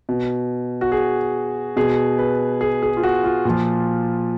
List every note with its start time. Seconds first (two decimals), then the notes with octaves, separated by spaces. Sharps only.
0.09 B2
0.81 F#4
0.92 G#4
1.77 B2 G#4
2.19 B4
2.61 G#4
2.83 G#4
2.97 F4
3.03 F#4
3.24 F4
3.45 A#2 F3